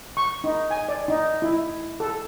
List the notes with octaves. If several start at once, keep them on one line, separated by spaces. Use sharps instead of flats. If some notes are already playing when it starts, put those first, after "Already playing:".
C#6
D#4
G#5
D5
D#4
E4
A4